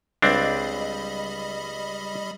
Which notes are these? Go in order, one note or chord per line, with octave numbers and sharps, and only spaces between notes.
C#2 G3 C4 D4 D#5 B5